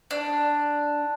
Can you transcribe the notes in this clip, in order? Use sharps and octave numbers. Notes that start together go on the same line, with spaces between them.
D4